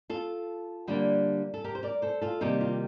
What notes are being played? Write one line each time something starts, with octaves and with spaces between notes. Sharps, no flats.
F4 A4
D3 G3 A#3 D4
A4
G4 A#4
C5
A#4 D5
A4 C5
F4 A4
C3 D#3 G3 A#3 D#4 G4
F4